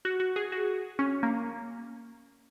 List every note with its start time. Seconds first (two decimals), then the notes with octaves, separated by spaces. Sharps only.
0.05 F#4
0.20 F#4
0.36 G#4
0.52 F#4
0.99 C#4
1.23 A#3